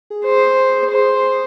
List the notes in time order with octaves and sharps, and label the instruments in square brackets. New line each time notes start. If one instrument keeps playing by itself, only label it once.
[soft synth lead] G#4
[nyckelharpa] C5
C5